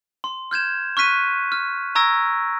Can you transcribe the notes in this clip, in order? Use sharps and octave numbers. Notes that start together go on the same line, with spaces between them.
C6
F6 G6 G#6 E7
C#6 F6 F#6 B6 D#7
F6
A#5 C#6 E6 G#6 A#6 D7